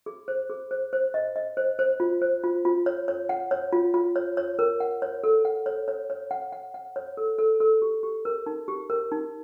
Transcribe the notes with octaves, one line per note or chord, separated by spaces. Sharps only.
G#4
C5
G#4
C5
C5
D#5
D#5
C5
C5
F4
C5
F4
F4
C#5
C#5
F#5
C#5
F4
F4
C#5
C#5
A#4
F#5
C#5
A4
F#5
C#5
C#5
C#5
F#5
F#5
F#5
C#5
A4
A4
A4
G4
G4
A#4
D#4
G4
A#4
D#4